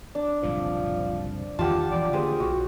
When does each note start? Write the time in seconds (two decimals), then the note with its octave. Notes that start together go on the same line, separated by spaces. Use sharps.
0.15 D4
0.43 F#1 C2 A#2 F3
1.59 E2 D#3 F4 G4 F#5 A5
1.91 D#1 E3 F3 D5
2.13 D3 A#3 D4 G4 G#4 C5
2.40 B1 F#4